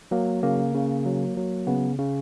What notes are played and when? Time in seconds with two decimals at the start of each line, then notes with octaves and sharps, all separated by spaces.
0.11 F#3 A#3
0.43 C#3 A#3
0.74 C#3
1.06 F#3
1.37 F#3
1.67 C#3 B3
1.99 C#3